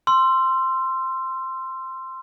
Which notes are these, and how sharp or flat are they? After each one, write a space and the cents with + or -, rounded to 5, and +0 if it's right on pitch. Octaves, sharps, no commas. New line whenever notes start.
C6 +0 E6 +30